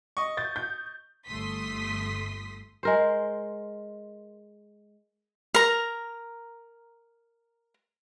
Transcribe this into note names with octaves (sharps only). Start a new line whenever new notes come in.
D#5 C#6
G6 A6
G6
G1 A3 C6 D#6 B6
G#3 A#4 C5
A#4 A#5